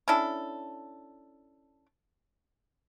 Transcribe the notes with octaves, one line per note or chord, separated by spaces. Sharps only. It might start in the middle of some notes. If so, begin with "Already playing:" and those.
C#4 D4 E4 A4